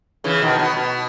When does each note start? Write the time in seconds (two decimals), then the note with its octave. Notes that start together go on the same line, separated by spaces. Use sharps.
0.24 C#3 E3
0.42 B2 D#3
0.59 B2
0.77 B2